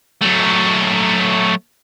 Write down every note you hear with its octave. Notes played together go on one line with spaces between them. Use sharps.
F#3 A3